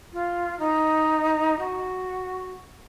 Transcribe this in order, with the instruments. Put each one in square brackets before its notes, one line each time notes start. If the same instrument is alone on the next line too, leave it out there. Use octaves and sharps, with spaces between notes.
[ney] F4
D#4
F#4